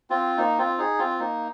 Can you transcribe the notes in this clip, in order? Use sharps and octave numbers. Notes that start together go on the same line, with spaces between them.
C4 F4
A#3 D#4
C4 F4
D#4 G#4
C4 F4
A#3 D#4